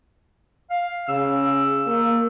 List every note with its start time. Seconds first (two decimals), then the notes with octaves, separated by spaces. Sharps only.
0.71 F5
1.09 C#3 E6
1.87 A#3